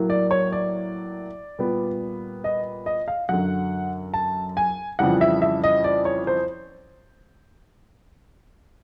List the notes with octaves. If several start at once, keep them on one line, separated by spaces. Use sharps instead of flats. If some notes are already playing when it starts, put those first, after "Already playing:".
Already playing: A2 F#3 A#3
D5
C#5
D5
A#2 G3 B3
D#5
D#5
F5
F#2 D3 F#3 F#5
A5
G#5
F2 C#3 E3 G3 F#5
E5
E5
D#5
D5
C#5
C5